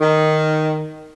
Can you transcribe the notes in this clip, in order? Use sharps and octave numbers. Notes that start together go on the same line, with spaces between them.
D#3